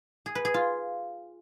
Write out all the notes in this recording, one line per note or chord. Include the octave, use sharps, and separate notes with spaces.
G#4
B4
G#4
F4